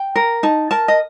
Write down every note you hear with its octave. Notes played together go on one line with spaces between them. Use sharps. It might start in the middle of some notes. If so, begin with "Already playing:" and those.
Already playing: G5
A#4
D#4 A5
A#4 A5
D#5